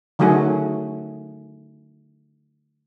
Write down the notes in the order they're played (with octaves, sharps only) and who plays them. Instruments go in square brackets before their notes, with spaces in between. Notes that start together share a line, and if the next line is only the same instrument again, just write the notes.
[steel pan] D3 D#3 F#3 A3 F#4 G#4